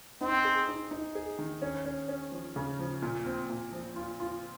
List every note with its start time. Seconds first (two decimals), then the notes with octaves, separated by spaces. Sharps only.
0.21 C4 D#4
0.45 G#4
0.68 D#4
0.91 D#4
1.15 G#4
1.38 D#3
1.62 C#4
1.85 C#4
2.08 C#4
2.32 F3
2.56 C#3
2.79 F3
3.02 A#2
3.26 C4
3.49 A#2
3.72 F3
3.96 F4
4.20 F4